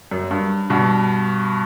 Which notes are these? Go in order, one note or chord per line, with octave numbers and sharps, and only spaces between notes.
F#2
G2
G2 B2